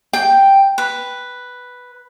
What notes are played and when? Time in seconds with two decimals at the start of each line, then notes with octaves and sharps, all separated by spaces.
0.13 G5
0.78 B4